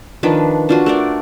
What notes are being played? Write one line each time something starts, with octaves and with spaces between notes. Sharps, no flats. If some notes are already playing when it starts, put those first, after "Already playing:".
D#3 F3 D4 B4
D4 F4 F#4
A3 A#4 D5